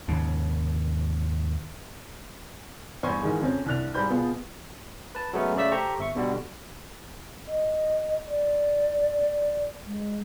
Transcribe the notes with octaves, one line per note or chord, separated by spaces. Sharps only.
D#2 G#2 C#3
E2 G2 C5 G#5 C#6 G#6
G#2 D#3 E3 G#3
F2 C#3 C4 C#4
C2 D4 F#6 F7
G#2 G3 C5 B5 G6
B2 B3 F4 G#4
B4 A5
F#3 G#3 A3 B3 C#4
C#3 A3 D5 E5 E6 B6
G4 A4 C5 A#5 C#6
G1 E5 C#6
B2 D3 G3 F#4
D#5
D5
G#3